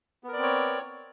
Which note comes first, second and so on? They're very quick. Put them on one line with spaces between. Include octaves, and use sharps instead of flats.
B3 A#4 D5 C4 C#5